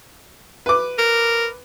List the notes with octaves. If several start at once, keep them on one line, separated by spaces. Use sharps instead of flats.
B4 D6
A#4